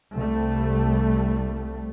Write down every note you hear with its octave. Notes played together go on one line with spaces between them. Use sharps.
C2 G3 A3